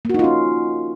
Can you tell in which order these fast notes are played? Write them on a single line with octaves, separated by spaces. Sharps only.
A#3 F#4 D#4 F4 C#4